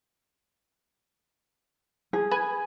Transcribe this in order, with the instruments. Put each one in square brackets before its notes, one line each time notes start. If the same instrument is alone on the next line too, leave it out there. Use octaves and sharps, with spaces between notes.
[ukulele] G#4
[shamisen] B4 [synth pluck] G#5